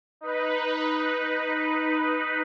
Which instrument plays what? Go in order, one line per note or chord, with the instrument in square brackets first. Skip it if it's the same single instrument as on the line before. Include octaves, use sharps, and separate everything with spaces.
[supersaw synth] D#4 B4